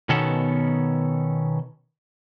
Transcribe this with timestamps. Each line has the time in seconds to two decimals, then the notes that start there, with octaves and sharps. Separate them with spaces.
0.09 B2 D#3 B3 C#4 F#4 A4